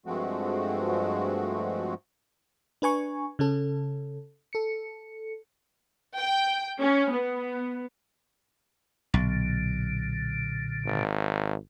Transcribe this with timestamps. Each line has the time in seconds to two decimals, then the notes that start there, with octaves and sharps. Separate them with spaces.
0.06 G2 F3 G#3 A3 C4 F#4
2.82 D4 B4 G#5 C#6
3.39 C#3 C#4 A4
4.53 A4 C#7
6.18 G5
6.81 C#4
7.11 B3
9.14 B1 A#2 D3
10.86 G#1